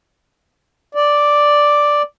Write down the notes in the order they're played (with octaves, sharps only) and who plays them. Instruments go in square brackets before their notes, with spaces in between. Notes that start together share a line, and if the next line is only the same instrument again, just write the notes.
[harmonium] D5